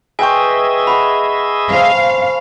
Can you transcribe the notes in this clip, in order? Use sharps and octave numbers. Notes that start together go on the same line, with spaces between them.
G#4 B4 D#5 E5 G5 G#5 C6 C#6
F#5 B5 C#6 E6
A4 C5 F5